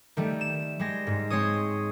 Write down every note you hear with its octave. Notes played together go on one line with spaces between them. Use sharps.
D#3 G3 A3
E7
G3 G#3 A#6
G#2
G#3 C4 C#5 D#6